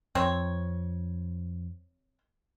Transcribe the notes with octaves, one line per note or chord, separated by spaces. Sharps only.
F2 C4 C5 C#5